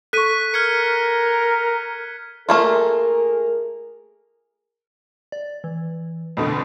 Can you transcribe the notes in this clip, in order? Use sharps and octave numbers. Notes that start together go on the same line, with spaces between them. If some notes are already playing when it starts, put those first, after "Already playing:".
A4 C#6 F#6 B6 D#7
A#4 F6 G#6 C#7
A3 A#3 F4 G#4 A#4
D5
E3
F2 B2 D3